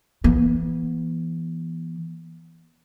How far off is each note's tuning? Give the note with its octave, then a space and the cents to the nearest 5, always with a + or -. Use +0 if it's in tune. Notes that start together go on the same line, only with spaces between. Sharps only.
E3 +15 B3 -35